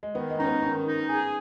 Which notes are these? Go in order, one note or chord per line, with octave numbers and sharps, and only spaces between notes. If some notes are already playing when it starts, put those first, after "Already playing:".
G#3
D#3 B3
G#3
C#4 D#4
B3
D#3 C#4
D#4
G#4